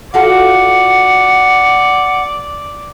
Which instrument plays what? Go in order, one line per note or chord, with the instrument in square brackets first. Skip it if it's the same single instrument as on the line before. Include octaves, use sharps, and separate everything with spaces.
[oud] F4 F#4 A4 [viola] D5 [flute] F#5